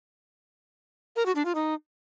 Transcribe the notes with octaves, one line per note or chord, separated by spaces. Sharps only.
A#4
F#4
D4
F4
D#4